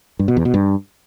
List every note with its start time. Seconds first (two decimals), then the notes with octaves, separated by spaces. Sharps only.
0.19 G2
0.28 B2
0.37 E2
0.45 B2
0.54 G2